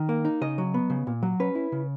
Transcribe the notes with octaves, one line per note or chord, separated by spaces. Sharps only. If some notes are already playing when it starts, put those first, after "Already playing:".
Already playing: D#3
A#3
D#4
C#3 D#5
F#3
B3
C#3
A#2
F#3
C#4 B4
E4
C#3